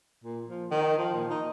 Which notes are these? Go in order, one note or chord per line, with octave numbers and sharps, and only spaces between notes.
A#2
F3
D#3
F3
A#2
D#4